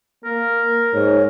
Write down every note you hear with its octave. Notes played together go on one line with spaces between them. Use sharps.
A#3 A#4
G#2 C#5